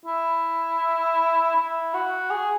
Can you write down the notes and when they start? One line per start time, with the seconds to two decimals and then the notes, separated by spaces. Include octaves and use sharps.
0.05 E4
1.56 E4
1.94 F#4
2.31 G#4